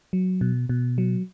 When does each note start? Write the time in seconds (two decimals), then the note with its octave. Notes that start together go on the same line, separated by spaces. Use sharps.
0.13 F#3
0.41 B2
0.69 B2
0.98 F#3